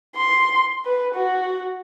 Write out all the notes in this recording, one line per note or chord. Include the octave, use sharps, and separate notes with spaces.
C6
B4
F#4